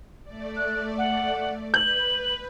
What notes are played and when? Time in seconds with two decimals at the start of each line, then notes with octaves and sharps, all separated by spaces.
0.23 A3 D5
0.56 F#6
0.97 F#5
1.74 B4 G6 F#7